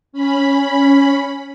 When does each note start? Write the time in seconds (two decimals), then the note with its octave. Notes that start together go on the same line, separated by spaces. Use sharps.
0.13 C#4 B5